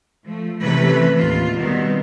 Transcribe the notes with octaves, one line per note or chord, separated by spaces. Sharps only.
F3 A3
C3 E3 A3 C#4 B4
D#2 A2 F4
B2 D#3 G3 B3 C4